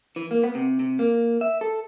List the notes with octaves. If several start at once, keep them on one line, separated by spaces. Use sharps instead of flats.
E3
A#3
B3
C3
C3
A#3
E5
A4